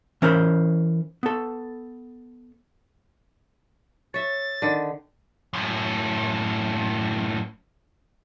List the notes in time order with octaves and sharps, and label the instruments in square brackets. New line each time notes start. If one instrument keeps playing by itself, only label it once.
[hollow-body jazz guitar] E3 C#4 A#4 C5 A#5 B5
B3 A4
[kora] C#5 E5 [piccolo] A6
[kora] D3 D#3
[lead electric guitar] F#2 A2